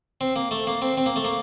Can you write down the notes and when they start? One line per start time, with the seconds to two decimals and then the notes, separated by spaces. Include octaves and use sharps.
0.21 C4
0.36 A#3
0.51 A3
0.67 A#3
0.82 C4
0.97 C4
1.06 A#3
1.16 A3
1.25 A#3